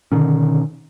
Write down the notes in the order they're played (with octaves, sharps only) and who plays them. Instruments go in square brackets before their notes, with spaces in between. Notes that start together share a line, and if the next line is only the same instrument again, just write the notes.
[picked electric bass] B2 D3 D#3 C#4